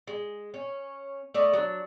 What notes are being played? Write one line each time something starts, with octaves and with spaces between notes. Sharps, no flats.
G#3
C#4
A3 D5 D#5
F#3 D4